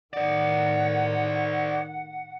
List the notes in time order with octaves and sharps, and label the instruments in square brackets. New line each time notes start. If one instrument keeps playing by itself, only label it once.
[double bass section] A2 D#3 [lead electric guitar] C5 D5 [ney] F#5